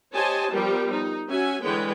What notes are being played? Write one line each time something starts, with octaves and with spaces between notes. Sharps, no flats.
G4 C5 C#5 D#5 G#5 A5
F3 G3 B3 G4 A#4
D#4
C#4 F#4 E5 G#5
D3 E3 G#3 B4 C#5 G5